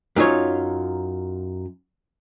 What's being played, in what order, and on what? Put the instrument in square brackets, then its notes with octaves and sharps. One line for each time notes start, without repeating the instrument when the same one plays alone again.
[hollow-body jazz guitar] F#2 D#4 F4 C#5